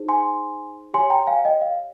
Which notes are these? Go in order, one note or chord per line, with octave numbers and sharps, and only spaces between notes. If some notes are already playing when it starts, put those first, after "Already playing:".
Already playing: D#4 G#4 C5
G#5 C6
G4 C#5 G#5 C6
G5 A#5
F5 G#5
D#5 G5
F5